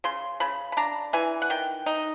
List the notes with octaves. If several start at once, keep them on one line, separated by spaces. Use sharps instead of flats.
C#3 C6
C#3 B5
B5
D4 A#5
E3 G#5
F#5
D#3 G5
D#4